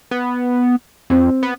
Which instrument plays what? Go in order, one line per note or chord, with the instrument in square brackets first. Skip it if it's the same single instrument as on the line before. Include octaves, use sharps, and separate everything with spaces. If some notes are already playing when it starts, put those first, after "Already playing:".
[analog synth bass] B3
[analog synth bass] F2 [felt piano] C4
[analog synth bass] B3